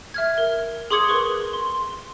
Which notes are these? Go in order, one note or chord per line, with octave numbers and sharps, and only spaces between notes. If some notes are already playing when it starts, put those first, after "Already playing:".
E5 F6 G#6
A#4
G#4 C6 D6 D#6 G#6 C#7
A#4 B4 C#6 G7
C6